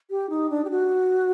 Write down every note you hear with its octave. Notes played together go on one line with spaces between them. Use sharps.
G4
D#4
D4
G4
F#4